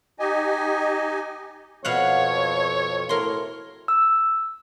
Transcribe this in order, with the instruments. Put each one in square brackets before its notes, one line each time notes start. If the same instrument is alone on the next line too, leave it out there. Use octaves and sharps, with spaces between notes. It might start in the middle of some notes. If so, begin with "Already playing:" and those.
[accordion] D#4 G4 D#5 G#5
[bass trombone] F2 [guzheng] B2 F5 F#5 [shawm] C#5
[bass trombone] A2 [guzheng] A#4 C6
[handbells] E6